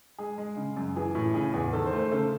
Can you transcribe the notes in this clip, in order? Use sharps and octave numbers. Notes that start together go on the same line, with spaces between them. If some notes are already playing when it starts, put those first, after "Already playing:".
G#3 G#4
G#3
C#3
F#2
E3 G#4
A2
C#3 G#4
E2 G#4
D#3 A4
C5
A3
C5
C#3 A4